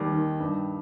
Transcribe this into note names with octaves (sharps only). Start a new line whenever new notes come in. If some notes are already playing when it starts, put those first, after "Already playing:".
Already playing: D#2 D#3 G3
D#3
G2